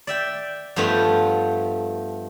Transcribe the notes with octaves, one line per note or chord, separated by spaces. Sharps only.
D5 E5 G5
G2 F3 A3 B3 F4 G5